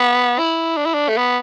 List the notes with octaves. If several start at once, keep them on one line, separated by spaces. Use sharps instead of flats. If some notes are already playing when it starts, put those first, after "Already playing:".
Already playing: B3
E4
D4
E4
D4
A3
B3